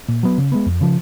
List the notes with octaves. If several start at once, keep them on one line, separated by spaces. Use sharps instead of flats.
A#2
F#3 B3
C#3
G#3 B3
F2
C#3 F3